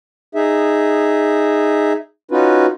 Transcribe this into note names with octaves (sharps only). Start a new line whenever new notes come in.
D#4 G#4 E5
C#4 D#4 F4 F#4 B4